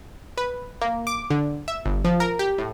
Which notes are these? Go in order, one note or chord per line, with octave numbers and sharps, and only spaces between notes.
B4
A#3
D6
D3
E5
G1
F3
A#4
G4
A2